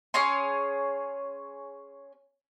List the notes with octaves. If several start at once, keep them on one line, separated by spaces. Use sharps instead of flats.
C#4 G#4 C#5 C6